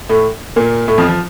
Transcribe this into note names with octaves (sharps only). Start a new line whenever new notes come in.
A2 A3
A#2 A#3
A2 A3
F2 F3
F3